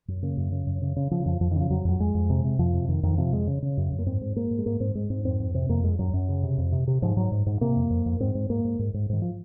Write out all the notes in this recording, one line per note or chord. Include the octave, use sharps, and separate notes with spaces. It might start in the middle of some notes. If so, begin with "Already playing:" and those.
F#2
C#3 A#3
F#2
C#3
F#2
C#3
C#3
C#3 F3
F2 F3
F2 F3
D#3
C#3 F3
F2 F#3
F2 F#3
F2 G#3
F2
C3
C3
F2 F3
C3
F2 D#3
F2 D#3
C3 F3
F2 G#3
C#3
C#3
F#2
F#2
A#3
G#2 C4
G#2
G#2 A#3
G#2
G#3
G#2 A#3
G#2 C4
G#2 G#3
G#2 C4
F2 C4
F2
C3 C4
F2 A#3
F#2 G#3
F#2 F#3
F#2
C#3
C3
F2
C3
C3
G#2 F3
G#2 F#3
G#2
G#2
C3 A#3
F2
F2
F2
G#2 C4
G#2
G#2 A#3
G#2
G#2
G#2
G#2 D#3
F3